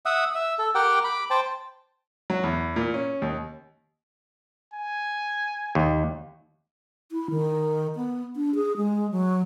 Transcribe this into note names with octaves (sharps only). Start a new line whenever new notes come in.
E5 F#5 D#6
E5
A4
G4 A#4 F#5 G5
B5 D6
C5 G5 A5
F#3
E2
A#2
C#4
D#2
G#5
D#2
E4
D#3
B3
D4
G#4
G#3
F#3